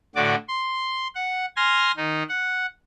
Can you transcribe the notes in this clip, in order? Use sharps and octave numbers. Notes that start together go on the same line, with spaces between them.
A2 D3 F#4 D5 D6
C6
F#5
G#5 C6 F6 A#6
D#3 D#4
F#5